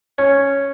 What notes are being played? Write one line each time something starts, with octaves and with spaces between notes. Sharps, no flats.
C#4